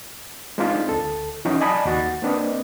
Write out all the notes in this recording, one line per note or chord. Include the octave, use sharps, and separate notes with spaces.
G#3 C4 D4 D#4 F4
D2 A4
E3 F#3 C#4 D#4 F#4
D5 D#5 G#5 A5 B5
D#2 F#4 A6
A#3 C4 D4 B4 D#5